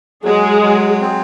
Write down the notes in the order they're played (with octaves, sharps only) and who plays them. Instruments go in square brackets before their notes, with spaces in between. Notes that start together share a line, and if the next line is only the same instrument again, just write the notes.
[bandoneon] F#3 [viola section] G#3 G#4
[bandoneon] F#3
C4